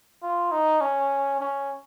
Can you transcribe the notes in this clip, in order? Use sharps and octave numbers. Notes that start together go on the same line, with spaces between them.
F4
D#4
C#4
C#4